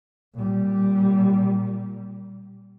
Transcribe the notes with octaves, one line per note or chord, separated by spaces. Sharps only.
A#2 G3